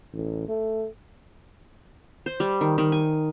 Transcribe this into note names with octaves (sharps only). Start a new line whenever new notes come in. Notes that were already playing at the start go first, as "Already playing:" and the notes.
A1
A3
C5
G3
D#3
D#3
G#5